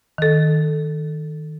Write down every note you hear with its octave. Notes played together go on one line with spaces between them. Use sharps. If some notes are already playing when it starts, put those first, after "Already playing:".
D#3 A4